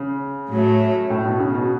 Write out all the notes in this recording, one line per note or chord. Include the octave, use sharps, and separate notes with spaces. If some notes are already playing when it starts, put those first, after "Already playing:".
Already playing: C#3
A2 F#3 A3
A2
B2
C#3
B2